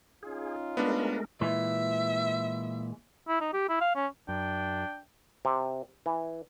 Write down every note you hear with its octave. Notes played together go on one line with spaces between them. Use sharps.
C#4 D#4 F4 G#4
G#3 A3 B3 D4 A#4
A#2 E3 G#3 E5
E4
D#4
G4
E4
F5
C#4
F#2 D4 G5
C3
E3